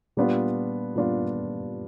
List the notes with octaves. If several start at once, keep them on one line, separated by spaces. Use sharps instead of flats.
A#2 G3 B3 D4 F4
A#2 G3 B3 D4 F4